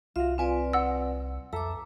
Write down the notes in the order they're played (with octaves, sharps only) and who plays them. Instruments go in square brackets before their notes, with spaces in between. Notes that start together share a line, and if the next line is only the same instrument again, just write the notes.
[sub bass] C2 [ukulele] F4 F#4 [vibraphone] E5 F5
[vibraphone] C4 B4 D5 [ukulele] F4 G#5
[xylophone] F#5 E6
[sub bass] F2 [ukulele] A4 E5 A5 [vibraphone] A#5 D6